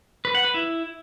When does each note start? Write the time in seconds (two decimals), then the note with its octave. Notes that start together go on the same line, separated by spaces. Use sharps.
0.25 B4
0.35 F#5
0.45 B4
0.54 E4